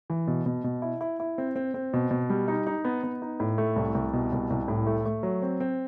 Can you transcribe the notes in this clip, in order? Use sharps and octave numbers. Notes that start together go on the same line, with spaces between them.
E3
B2
B2
B2
E4
E4
E4
C4
C4
C4
B2
B2
G3
D#4
D#4
B3
B3
D#4
A2
A3
C2
C2
B2
C2
C2
A2
A3
A3
F#3
C4
C4